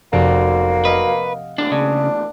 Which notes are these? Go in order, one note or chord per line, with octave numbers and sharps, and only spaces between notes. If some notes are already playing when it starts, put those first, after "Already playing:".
F1 B1 A#3 F#4 D5
B4 D#5 F5 F#5
E2 A2 A#3 D4
C#3 D4